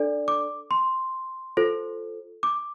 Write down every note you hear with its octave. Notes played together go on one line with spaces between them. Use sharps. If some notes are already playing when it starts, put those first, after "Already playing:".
Already playing: D4 A4 D5
D6
C6
F4 A4 C5
D6